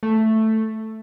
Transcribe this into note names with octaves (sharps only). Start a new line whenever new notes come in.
A3